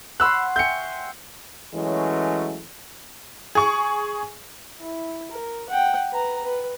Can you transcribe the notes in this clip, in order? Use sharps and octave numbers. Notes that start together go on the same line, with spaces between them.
C#5 F#5 B5 C6 E6 F#6
E5 G5 G#5 G6 C#7
E3 F#3 G#3 A3 C#4
G#4 C#6
E4
A#4
F#5 G5
B4 A#5
B4